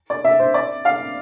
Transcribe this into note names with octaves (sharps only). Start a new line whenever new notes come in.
D5
E5
C5
D5
F5